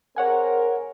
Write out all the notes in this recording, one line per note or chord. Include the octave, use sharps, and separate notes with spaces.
C4 G#4 A#4 C#5 F#5 G#5